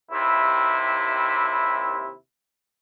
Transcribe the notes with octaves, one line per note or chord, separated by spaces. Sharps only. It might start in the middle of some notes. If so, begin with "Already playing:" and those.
D#2 C3 E4